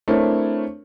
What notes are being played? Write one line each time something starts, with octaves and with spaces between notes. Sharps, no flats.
A3 C4 D4 E4 A#4 C#5